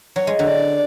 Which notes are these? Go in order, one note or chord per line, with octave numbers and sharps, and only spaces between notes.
F#3 C#5
G#3
D3 F#3
D5